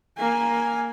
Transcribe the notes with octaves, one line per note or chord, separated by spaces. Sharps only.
A#3 G#5